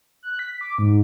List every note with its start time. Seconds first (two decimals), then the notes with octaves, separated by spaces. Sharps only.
0.23 F#6
0.39 B6
0.61 D6
0.78 G#2